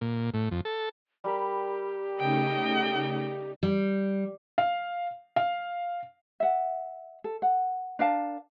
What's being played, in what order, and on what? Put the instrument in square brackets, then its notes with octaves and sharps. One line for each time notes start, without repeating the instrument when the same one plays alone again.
[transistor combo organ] A#2
A2
F2
A4
[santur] G3 A#4 B5 [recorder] G4
[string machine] C#3 A3 D#4 [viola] D#5 G5
[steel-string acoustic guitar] G3
[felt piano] F5
F5
[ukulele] E5 F#5
A4
F#5
D4 A#4 F5 A5